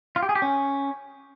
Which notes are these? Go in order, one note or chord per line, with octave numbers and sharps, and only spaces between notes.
F4
G4
G#4
G4
C#4